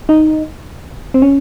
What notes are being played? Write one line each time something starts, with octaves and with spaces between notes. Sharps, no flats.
D#4
C4
C#4